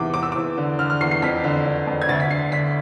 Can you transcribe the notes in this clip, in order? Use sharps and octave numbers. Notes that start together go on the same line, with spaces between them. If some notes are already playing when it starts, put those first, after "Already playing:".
Already playing: E2 G#2 C3 E3 D6
E2 D6
E6
E2 D6
D3
D3 F6
F6
E2 C7
C7
F2 B6
D3
D3
F2
G#6
D2 A6
B6
D3 C7
D3 B6